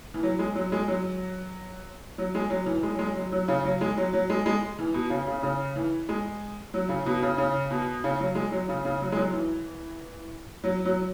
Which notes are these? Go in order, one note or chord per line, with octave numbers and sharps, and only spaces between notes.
E3
F#3
G#3
F#3
G#3
F#3
F#3
G#3
F#3
E3
G#3
F#3
G#3
F#3
F#3
C#3
F#3
G#3
F#3
F#3
G#3
G#3
E3
B2
C#3
C#3
C#3
E3
G#3
F#3
C#3
B2
C#3
C#3
B2
C#3
F#3
G#3
F#3
C#3
C#3
F#3
G#3
F#3
E3
F#3
F#3